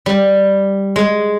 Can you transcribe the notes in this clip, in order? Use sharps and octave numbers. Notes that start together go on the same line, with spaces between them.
G3
G#3